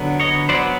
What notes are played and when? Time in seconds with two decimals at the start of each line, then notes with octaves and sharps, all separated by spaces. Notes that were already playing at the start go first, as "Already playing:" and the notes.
Already playing: D3 F#3 B3
0.20 C#5 D#5
0.49 F#3 B3 C5 D5